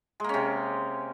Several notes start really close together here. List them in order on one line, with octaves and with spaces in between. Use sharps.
G#3 A#3 C#4 C3